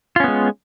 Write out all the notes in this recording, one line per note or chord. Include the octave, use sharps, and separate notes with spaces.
G#3 B3 C#4 F4